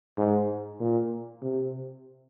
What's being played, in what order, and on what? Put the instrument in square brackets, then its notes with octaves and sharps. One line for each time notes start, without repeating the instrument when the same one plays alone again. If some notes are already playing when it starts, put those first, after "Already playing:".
[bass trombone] G#2
A#2
C3